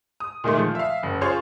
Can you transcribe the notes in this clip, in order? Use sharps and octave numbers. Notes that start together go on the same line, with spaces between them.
D#6
A#2 D#3 G#3 A3
F3
E5 F5
F#1
F4 G#4 C5 C#5 C6 C#6